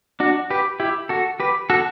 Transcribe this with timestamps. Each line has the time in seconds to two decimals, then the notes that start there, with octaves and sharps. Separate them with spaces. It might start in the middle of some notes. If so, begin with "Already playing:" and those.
0.20 D4 F#4
0.50 G4 B4
0.80 E4 G4
1.09 F#4 A4
1.40 G4 B4
1.70 F#4 A4